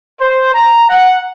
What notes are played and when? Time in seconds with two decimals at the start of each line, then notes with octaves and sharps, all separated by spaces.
0.19 C5
0.53 A#5
0.90 F#5